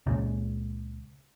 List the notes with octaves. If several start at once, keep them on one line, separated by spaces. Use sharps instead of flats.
C#2 A#2 C#3